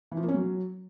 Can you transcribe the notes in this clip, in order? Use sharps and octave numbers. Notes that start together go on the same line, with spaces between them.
E3
F3
A#3
C#4
F#3